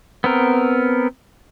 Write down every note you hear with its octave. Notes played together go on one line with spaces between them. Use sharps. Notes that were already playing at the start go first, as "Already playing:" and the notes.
B3 C4 A#4